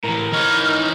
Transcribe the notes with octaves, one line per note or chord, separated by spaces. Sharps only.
A2 E3 A#4
E3 D#4 C#5 F6